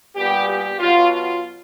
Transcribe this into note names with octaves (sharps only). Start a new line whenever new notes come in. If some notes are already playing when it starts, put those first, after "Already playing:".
A#2 G3 B3 G4
G4
B2 F#3 B3 F4
F4